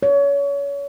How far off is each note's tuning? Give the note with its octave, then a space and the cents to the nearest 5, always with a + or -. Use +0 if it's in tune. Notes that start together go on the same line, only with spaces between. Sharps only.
C#5 +30